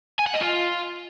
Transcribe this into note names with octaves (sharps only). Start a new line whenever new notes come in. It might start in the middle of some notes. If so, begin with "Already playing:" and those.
G#5
F#5
D#5
F4